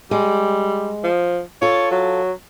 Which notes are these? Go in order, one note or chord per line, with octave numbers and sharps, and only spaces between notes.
G3 G#3
F3
F4 A4 C#5
F#3